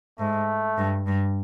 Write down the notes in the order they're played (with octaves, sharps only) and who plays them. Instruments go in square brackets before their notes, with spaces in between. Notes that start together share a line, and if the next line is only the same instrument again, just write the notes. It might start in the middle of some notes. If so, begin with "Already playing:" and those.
[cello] G#2 [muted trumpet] A3
[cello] G2
G2